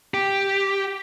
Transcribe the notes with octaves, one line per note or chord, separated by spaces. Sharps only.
G4